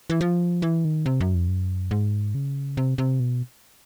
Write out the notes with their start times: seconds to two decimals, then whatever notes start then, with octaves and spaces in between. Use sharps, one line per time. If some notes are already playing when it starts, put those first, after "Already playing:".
0.10 E3
0.21 F3
0.62 E3
0.85 D#3
1.06 C3
1.20 F#2
1.35 F2
1.48 F#2
1.91 G#2
2.35 C#3
2.77 C3
2.98 C3
3.20 B2